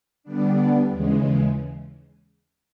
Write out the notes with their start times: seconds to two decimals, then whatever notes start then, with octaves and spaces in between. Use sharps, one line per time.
0.24 D3 G3 B3 D4
0.87 D#2 C#3 E3 G#3